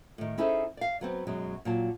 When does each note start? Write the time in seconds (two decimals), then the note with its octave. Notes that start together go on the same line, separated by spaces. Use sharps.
0.18 A2 D#3
0.38 C#4 D#4 E4 G#4 A4 C5
0.77 D5 F5
1.01 F#3 B3 C4
1.27 F#2 B2 F#3 G#3
1.65 A#2 F#3 A5